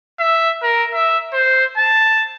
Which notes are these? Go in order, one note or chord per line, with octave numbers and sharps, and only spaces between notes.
E5
A#4
E5
C5
A5